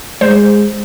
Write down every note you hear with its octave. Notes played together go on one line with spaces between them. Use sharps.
G#3 C5